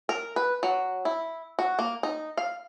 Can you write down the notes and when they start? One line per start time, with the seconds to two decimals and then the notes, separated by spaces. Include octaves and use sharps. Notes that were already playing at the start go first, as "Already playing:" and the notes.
0.09 A#4
0.36 B4
0.63 F#3
1.05 E4
1.59 F#4
1.79 A#3
2.03 D#4
2.37 F5